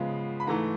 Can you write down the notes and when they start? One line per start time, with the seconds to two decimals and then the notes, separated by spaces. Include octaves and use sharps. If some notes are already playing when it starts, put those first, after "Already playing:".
Already playing: C#3 F3 G#3 B3
0.40 B5
0.47 G#2 E3 A3 A#5